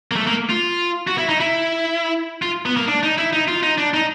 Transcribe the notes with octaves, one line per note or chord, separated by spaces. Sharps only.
A#3
A3
A#3
F4
F#4
E4
D#4
E4
F4
B3
A#3
D4
D#4
E4
D#4
F4
D#4
D4
D#4